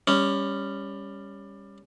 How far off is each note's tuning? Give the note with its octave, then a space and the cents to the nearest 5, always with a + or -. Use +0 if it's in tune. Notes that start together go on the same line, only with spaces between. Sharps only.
G3 +20 C#4 +0